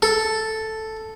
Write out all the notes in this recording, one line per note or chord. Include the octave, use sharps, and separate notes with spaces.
A4